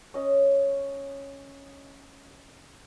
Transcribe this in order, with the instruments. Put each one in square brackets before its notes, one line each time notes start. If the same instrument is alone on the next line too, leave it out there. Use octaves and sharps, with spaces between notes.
[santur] C#4 D#5